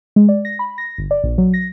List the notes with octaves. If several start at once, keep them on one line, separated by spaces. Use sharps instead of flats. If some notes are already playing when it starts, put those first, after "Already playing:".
G#3
D5
A#6
B5
A#6
G1
D5
A#1
F#3
A#6